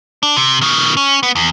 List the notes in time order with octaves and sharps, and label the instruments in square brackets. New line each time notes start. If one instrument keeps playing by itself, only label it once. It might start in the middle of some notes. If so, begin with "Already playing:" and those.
[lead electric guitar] D4
C3
B2 D#3
C#4
B3
E2